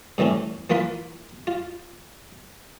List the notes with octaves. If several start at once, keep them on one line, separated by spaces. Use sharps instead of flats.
G2 C3 E3 A3 C#4
E3 A#3 F4 B4 C6
F4